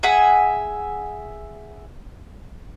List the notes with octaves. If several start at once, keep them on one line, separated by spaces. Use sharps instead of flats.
G#4 E5 F#5 G#5